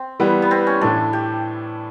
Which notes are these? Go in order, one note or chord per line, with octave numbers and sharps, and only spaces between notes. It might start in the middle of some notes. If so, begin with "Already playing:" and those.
Already playing: C4
E3 G3 B3
B3
C4
C#4
A2 E3 A3 D4
G4